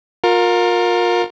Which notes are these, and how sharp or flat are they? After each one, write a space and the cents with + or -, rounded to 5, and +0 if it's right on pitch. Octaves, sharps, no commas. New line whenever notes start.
F4 +35 A#4 +0